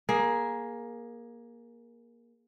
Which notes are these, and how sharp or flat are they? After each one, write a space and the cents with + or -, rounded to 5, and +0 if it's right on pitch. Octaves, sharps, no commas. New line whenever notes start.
A#3 +15 G#4 +0